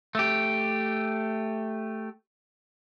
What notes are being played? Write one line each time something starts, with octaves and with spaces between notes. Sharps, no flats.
A3 G4